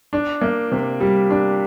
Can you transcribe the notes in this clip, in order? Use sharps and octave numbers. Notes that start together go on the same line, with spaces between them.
D4
A#3
C3
G3
D4